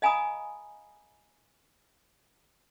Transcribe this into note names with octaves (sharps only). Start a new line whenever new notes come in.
D#5 F5 G#5 A#5 B5 D#6